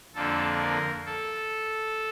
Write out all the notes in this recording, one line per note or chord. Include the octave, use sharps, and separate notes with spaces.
F2 D3 F3 A#3 A4
A#4
A4